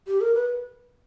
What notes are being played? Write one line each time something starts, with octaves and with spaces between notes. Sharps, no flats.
G4
A#4
B4